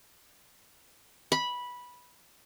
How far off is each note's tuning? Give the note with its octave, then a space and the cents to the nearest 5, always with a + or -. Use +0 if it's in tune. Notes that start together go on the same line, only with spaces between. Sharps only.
B5 -10